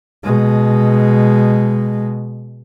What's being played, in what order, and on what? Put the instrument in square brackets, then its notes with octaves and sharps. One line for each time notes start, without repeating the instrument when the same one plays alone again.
[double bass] B2 G#3